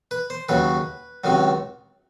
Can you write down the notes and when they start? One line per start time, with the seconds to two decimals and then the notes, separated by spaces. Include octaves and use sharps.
0.11 B4
0.30 C5
0.49 D#2 C#3 F#3 B4
1.24 C#2 C3 D#3 F#3